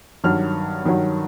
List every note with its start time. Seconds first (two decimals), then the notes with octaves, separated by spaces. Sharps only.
0.24 G2 D#3 F#3 F6
0.84 G2 D#3 F#3